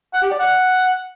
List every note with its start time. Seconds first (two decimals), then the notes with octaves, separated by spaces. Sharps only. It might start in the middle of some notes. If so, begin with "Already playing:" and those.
0.14 F#5
0.22 G4
0.31 D5
0.40 F#5